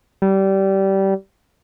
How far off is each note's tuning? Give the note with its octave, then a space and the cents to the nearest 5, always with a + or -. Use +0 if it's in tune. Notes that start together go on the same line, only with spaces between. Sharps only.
G3 -20